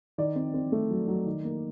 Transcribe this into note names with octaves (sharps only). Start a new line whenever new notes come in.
D#3 D5
C4
C4
A3
F#3
F#3
D#3
A#3